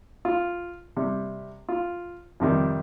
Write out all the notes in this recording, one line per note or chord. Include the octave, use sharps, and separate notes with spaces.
F4
C3 G3
F4
F2 C3 D#3 G3